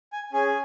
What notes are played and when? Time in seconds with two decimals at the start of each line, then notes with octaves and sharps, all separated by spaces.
0.13 G#5
0.33 C#4 G#4 G#5